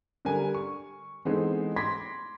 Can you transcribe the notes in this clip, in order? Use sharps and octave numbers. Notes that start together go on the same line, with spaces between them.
D3 G3 A#4 G#5
C#6
E3 G#3 B3 C4 D#4 A4
B5 C6 D6 G#6 A#6 B6